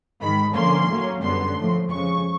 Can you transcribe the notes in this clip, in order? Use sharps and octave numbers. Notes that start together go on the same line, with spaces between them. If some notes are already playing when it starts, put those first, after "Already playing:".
G#2 D#3 G#3 B5
D3 F3 A#3 C#4 C6
A2 F#3 A#3 C#4
F#2 D3 G3 B3 C6
A2 F3 A3
F2 C#3 F3 G#3 C#6